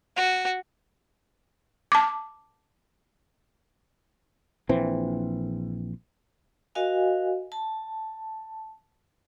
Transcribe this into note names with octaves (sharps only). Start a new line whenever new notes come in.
F#4
A5 D6
A#1 E3 C4
F#4 A#4 D#5 F5 G#5
A5